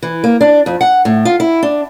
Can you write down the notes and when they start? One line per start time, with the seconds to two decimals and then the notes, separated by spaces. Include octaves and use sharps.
0.03 E3
0.24 A#3
0.41 D4
0.66 F2
0.81 F#5
1.05 A2
1.25 F4
1.40 E4
1.63 D4